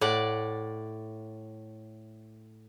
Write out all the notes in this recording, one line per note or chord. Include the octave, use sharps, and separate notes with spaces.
A2 D5 F#5